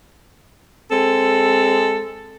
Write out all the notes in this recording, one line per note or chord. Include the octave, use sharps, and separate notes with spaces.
G#3 C4 A4